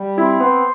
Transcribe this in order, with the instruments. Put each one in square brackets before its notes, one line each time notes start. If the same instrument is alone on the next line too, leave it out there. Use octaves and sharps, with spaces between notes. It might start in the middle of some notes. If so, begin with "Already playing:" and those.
Already playing: [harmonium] G3
[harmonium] C4 [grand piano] E4
[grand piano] B3 [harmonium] C5